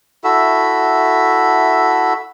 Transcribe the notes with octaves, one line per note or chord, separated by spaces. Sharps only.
E4 F#4 A4 E5